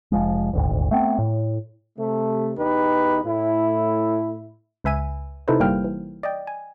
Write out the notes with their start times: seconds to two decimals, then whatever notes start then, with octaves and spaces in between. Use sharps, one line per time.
0.12 F1 C2 F3 G#3
0.53 D#1 G#1 D2
0.91 A3 B3 C4
1.19 A2
1.98 C3 A3
2.57 E2 D#4 G4 B4
3.25 A2 E4
4.84 C#2 B4 E5 G#5 D#7
5.48 C3 D#4 E4 A4 B4 C5
5.60 G1 G3 A#3 C5 G5 F6
5.84 E3
6.23 D5 D#5 G5
6.47 G#5